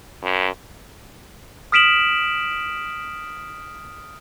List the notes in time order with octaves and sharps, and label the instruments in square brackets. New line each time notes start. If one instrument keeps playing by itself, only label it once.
[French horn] F#2
[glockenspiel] D#6 F6 B6 D7 E7 F#7